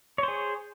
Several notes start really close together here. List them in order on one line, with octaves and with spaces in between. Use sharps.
C#5 C5 G#4